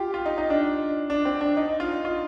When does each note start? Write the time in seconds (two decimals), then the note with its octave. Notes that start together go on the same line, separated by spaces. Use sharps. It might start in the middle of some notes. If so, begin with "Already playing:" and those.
Already playing: F4 G4
0.14 F4
0.26 D#4
0.38 D#4
0.50 D4
1.10 D4
1.25 C4
1.41 D4
1.57 D#4
1.80 F4
2.05 F4